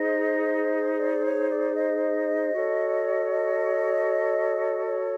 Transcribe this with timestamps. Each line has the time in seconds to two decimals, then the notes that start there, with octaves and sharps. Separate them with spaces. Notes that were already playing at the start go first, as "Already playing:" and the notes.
Already playing: D#4 G#4 C5 D#5
0.98 D5
1.24 C#5
1.50 D5
1.76 D#5
2.53 F#4 A4 C#5
3.31 D#5
4.86 C#5